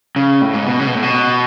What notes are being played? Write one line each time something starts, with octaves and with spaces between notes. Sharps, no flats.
C#3
A2
G#2
B2
C#3
B2
A2
B2